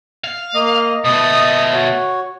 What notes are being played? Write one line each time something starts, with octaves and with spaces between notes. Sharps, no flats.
F5
A#3 D#5
B2 A3 D#5 D#6
F#4 C#5